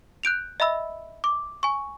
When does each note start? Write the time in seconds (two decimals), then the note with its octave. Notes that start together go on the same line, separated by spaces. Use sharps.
0.23 F#6 G6 D7 F7
0.60 D#5 E5 B5 E6
1.24 D6
1.63 G#5 C#6